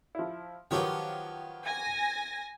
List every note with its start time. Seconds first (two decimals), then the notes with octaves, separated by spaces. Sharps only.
0.15 F3 E4
0.71 D#3 F3 F#3 B3 G4 C#5
1.67 G#5 A#6